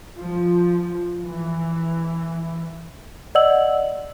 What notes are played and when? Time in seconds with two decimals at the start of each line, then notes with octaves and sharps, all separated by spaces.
0.16 F3
1.23 E3
3.35 D5 D#5 F#5 E6 F#7